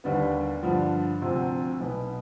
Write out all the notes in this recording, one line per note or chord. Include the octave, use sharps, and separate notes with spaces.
D#2 D3 G3 B3
G2 D3 F3
D2 C3 F3 C4
B1 B2 B3